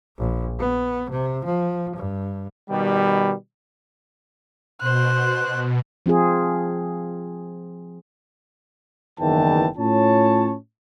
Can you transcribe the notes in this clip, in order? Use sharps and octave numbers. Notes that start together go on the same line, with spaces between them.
A#1
B3
C3
F3
G2
B2 D#3 G3
B2 C5 F#6
F3 C4 F4 G#4
F#1 E2 D#3 E3 G5 A5
A2 C#4 F4 C#5 A5